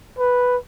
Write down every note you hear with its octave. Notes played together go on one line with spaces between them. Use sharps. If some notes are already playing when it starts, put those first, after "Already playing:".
B4